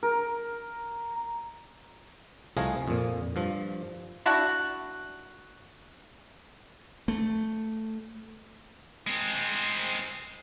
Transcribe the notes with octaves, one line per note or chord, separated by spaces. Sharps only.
A#4
C2 F3 A3 G#4 D#5 F5
F2 A#2
G2 F3
D4 E4 F#4
A3
G#3 C4